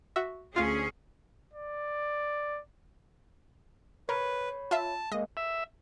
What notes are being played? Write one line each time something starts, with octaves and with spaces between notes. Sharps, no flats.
F#4 E5
D2 C#4 F4 G#4 F5
D5
A#4 B4 C#5 B5
F4 E5 A5
G#3 A#3 D#5
E5